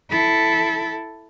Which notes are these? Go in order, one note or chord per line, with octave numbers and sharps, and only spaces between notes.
E4 A4